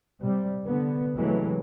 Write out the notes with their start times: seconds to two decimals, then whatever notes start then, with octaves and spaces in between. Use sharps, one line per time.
0.21 C3 G3
0.64 D3 B3
1.16 C3 E3 F#3 G#3 A3